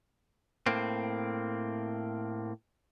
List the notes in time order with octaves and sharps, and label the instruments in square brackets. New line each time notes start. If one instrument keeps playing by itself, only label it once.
[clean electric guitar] A2 A#3 C4